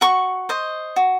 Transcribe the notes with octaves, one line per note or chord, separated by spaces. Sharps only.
F#4 C#6
C5 D#5
F#4